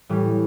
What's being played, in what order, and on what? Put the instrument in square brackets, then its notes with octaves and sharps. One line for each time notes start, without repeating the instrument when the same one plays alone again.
[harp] A2 E3 G3